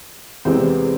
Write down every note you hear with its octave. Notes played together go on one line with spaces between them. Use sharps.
E2 C3 G#3 B3 C4 C5